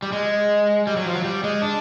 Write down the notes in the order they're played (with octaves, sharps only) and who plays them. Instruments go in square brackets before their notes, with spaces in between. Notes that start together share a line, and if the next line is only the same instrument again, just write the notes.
[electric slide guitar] G3
G#3
G3
F#3
F3
F#3
G3
G#3
D4